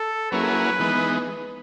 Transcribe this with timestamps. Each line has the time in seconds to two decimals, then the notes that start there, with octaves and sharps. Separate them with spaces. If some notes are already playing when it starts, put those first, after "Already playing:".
Already playing: A4
0.32 F#3 A#3 C#4 E4 G#4 B4
0.80 E3 G#3 B3 D#4